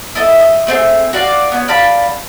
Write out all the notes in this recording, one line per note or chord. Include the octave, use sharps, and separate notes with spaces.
E4 A4 D#5
D#5
A3 C4 D4 G#4
F#4 D5 F5
B3 C#4
D5 F5 A5 B5